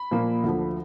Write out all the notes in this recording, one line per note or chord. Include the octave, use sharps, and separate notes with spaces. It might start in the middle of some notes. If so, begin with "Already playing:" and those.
Already playing: B5
A#2 F3 A#3
D2 D3 F3